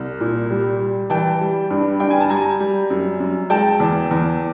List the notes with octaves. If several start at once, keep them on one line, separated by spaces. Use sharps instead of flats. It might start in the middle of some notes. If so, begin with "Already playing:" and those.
Already playing: C2
A#2
G3
G3
E3 G5 A5
G3
G2
G2 G5
G#5
A5
G3 G#5 A#5
G3
F#2
F#2
G#3 G5 A5
E2
E2